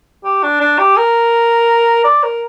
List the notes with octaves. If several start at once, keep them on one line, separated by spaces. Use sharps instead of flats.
G4
D4
D4
G4
A#4
D5
A#4